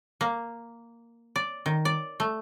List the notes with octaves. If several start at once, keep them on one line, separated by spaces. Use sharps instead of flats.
A#3
D5
D#3
D5
A3